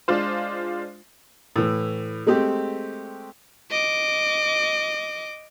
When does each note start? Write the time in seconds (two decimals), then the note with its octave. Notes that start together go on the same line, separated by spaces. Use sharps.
0.08 G#3 D4 F4 C5
1.56 A2 E3
2.27 G#3 A3 C4 G4
3.71 D#5 D6